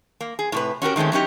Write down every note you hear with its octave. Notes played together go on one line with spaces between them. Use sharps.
A#3
G#4
A2 C3 B4
C#4 F#4 G4 A#4
D#3 G#3 A3 C4 C#4
F#3 C#4 D#4 G4